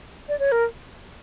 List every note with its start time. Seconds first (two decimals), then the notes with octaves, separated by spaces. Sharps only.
0.29 D5
0.39 C#5
0.52 A#4